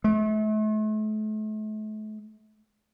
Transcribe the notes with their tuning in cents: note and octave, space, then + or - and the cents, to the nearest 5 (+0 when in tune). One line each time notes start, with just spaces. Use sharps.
A3 -40